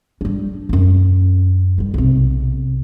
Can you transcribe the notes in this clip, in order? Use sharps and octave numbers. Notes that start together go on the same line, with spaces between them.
G3 D4
F#2 C#4
D#3 G3
B1 C3